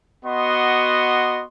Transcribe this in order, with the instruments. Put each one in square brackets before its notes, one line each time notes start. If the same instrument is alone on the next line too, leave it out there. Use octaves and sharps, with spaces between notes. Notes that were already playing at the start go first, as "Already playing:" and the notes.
[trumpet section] B3 F#4 D#5 C6